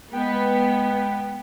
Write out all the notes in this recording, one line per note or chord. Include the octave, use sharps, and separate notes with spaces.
G#3 B3 G5